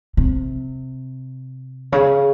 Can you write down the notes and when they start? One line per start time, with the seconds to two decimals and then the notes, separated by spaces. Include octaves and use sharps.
0.17 C3
1.92 C#3